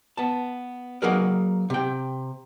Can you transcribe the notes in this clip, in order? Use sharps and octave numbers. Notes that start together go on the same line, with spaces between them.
B3 A5
F#3 A#3 D#4 G#4 A#4 B4
C3 G5